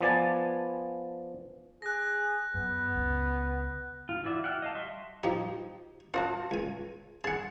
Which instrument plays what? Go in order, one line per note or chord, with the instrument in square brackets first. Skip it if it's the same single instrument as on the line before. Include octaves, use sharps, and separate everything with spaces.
[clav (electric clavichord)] F3 B3 D5 G#5 A5
[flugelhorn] G#4 [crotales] F#6 A#6
[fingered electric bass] F#2 [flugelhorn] B3
[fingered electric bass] C#2
[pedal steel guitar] F4
E3 E4 F#4 D5 E5
F#5 G5 F6
D#5 F5 A5
G3 E5 C6 C#6
[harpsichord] F3 G4 [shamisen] D#4
[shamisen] F4 F#4 A5 [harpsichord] C5
[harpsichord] C#2 G#5
[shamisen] G#4 [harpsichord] F#5 A5